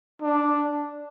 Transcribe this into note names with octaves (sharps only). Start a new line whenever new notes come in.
D4